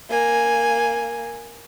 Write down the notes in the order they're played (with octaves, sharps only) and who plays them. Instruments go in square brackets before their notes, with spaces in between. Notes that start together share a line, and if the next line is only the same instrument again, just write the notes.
[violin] A#3 G#5